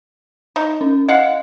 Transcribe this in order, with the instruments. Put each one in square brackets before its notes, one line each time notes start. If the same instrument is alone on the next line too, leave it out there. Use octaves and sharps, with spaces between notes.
[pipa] D#4
[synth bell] C#4
[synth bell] D#5 [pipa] F5 F#5